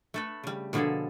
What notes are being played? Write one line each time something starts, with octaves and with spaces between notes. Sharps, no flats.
A3 A4 B4
C#3 G3
B2 D3 F3 A#3 G#4 A4